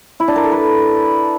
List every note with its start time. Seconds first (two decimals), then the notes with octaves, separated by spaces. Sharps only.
0.20 E4
0.28 D4
0.36 A#4
0.44 A4
0.52 B4